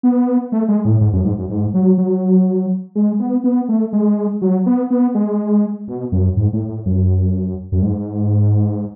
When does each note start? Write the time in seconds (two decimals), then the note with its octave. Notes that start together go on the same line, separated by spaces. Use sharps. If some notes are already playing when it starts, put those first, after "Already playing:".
0.03 B3
0.52 A3
0.68 G#3
0.85 A2
1.01 G#2
1.13 F#2
1.25 G#2
1.38 F#2
1.50 G#2
1.74 F#3
1.98 F#3
2.95 G#3
3.20 B3
3.44 B3
3.69 A3
3.93 G#3
4.42 F#3
4.66 B3
4.91 B3
5.15 G#3
5.88 B2
6.12 F#2
6.37 G#2
6.53 A2
6.69 A2
6.86 F#2
7.72 F#2
7.83 G#2